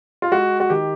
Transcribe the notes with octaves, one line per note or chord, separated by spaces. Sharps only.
F4
G#3 F#4
F#4
D#3 G4